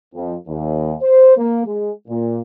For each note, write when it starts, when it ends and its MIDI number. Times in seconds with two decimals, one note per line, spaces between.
0.15 0.35 41
0.48 0.95 39
1.02 1.36 72
1.37 1.63 58
1.66 1.92 56
2.08 2.40 46